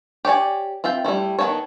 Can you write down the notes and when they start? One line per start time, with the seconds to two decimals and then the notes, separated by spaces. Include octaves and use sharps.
0.25 G4 C#5 D5 G#5
0.84 C4 F4 E5 G5
1.04 G3 A3 C#4 E4
1.39 D#3 B3 C#4 A4 C#5